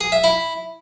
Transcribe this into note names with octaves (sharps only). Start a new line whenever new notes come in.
G#4
E5
E4